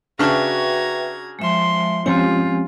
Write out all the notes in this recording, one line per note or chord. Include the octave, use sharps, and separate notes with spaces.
C#3 D4 F#4 B4 E5 G5 A#5 G#6
F3 G#3 E5 C6
F3 G#3 C4 C#4 F4 G4 G#5